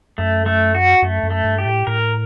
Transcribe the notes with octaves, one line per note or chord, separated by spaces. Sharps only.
F#2 A3
A3
F#4
F#2 A3
F#2
A3
G2
G4
A2
A2 A#4